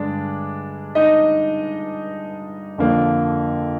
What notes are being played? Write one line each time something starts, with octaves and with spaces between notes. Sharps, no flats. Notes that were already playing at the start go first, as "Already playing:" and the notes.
Already playing: G2 D3 G#3 D4 D5
D#4 D#5
F2 D3 F3 A#3